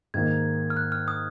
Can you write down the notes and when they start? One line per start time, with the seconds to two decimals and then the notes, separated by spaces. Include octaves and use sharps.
0.14 G#2 D#3 A#3 D#4 G#6
0.70 F6
0.77 F#6
0.92 F6
1.08 D#6